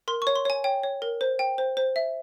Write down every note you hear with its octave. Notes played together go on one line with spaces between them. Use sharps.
A#4 C6
C#6
C#5
C6
C#5 G#5
C#5 G5
C#5
A#4
C5
G5
C5
C5
E5